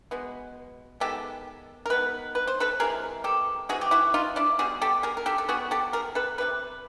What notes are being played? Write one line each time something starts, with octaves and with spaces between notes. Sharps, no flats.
B2 G#3 B3
D#3 G#3 B3 G4 A4
A#4
D#3 G#3 B3 B4
B4
C5
A4 B4
C3 E3 G#3 G#4 A#4
G4 A4
C3 E3 G#3 F#4 G#4
G4
E4 F#4
D#4 F4
D4 E4
B2 G3 B3 F#4 G#4
G4 A4
G#4 A#4
A#4
G4 A4
A4
B2 G3 B3 F#4 G#4
G4 A4
G#4 A#4
A4 B4
C3 D#3 G3 B4